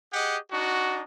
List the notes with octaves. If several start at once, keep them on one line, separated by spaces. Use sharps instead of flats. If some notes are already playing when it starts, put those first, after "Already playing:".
G4 G#4 D#5 F#5
D4 D#4 F#4